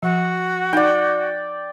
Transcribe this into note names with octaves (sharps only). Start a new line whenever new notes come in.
F3 F#4
D#4 D5 F#5 G5